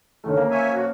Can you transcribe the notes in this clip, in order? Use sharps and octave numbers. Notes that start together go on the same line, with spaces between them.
D3 D#3 F#3 A3 C#4
C#3 F3 F#3 A#3
C#5 E5 G#5
A#2 F#4 A4 C#5 F5